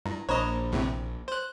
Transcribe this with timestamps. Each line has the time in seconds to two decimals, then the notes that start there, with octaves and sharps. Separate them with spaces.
0.06 G2 E4
0.29 A#1 D4 C5 C#5 D#5 A#5 B5
0.72 E2 A2 C3
1.28 C5 F#6